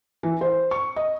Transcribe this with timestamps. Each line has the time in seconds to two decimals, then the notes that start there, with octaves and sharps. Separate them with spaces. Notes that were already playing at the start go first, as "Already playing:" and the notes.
0.23 E3
0.41 C5
0.71 C#6
0.96 D#5